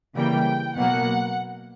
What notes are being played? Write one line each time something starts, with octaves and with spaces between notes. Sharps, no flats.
C#3 E3 G3 A#3 G5
B2 F#3 A#3 F#5